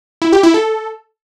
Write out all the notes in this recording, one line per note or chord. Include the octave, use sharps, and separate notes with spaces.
E4
G4
E4
A4